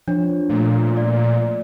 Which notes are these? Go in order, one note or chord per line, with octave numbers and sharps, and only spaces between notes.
F3 D4 C#5
A#2 A3
D5